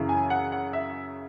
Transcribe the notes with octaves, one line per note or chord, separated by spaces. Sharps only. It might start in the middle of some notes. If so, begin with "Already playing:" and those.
Already playing: F#2 C#3 E3
G#5
F#5
F#5
E5